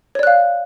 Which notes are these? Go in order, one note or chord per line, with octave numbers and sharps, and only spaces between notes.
C#5 D5 F5 F#6